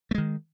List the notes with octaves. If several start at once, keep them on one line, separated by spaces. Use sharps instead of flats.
D#3 G#3 A3